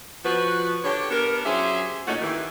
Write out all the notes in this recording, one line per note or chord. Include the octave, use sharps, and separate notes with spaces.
F3 F#4 B4
D3 G4 C#5
B3 D4 G4 A#4
F#3 C#4 G4 G#4 C5 E5
A#2 A3 C#4 D#4 F#4
D#3 E3 G4